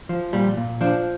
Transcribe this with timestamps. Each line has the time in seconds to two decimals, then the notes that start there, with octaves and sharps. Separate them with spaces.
0.09 F3
0.33 A#2 G3
0.57 A#2
0.81 F3 D4